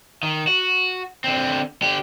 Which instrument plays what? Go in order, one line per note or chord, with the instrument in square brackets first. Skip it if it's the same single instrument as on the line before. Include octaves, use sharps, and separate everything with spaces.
[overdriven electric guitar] D#3
F#4
D3 C4
D3 G4